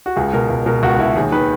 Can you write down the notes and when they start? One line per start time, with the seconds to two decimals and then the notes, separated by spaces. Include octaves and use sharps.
0.06 F#4
0.16 C#2 G#4
0.33 B2 A#4
0.50 C#2
0.66 B2 A#4
0.83 C#2 F#4
0.99 B2 E4
1.16 D#2 G#4
1.32 D#3 B4